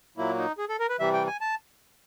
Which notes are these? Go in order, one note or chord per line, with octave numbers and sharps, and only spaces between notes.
A#2 F#3 A#3 E4
D#4
G#4
A4
A#4
B4
C3 E3 G3 E5
G5
G#5
A5